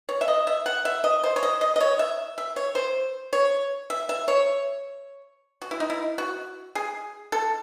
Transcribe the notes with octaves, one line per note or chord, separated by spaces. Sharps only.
C#5
E5
D#5
E5
F#5
E5
D#5
C5
C#5
D#5
D#5
D#5
C#5
E5
E5
C#5
C5
C#5
E5
E5
C#5
F#4
E4
D#4
E4
F#4
G#4
A4